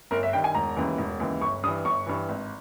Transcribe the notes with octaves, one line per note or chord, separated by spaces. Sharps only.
G1 A#4
E5
G2 D#3 G5
G#5
E1 A#5
D#2 C#3 E3
E1
D#2 C#3 E3
G1 C#6
G2 E3 D#6
G1 C#6
G2 E3
G#1